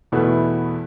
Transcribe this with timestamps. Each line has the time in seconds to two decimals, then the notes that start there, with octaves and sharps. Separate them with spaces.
0.12 E2 B2 A3 E4 B4